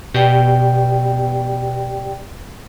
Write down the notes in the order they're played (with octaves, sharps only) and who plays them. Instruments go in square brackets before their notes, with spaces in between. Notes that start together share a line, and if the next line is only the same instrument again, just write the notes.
[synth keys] B2 [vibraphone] G4 D5 G5